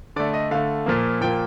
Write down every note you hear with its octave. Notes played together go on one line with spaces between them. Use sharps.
D3 A3 D5
D#5
D3 A3 F5
A#2 F3 A#3
A#2 F3 A#3 G5